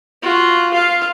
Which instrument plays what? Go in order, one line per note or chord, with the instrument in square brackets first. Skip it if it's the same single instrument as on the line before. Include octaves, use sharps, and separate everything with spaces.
[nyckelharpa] F4 F#4
F4 F5